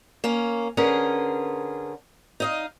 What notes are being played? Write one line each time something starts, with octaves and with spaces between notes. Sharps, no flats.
A#3 C#4
D3 C#4 G#4 A#4 B4
D#4 D#5 F5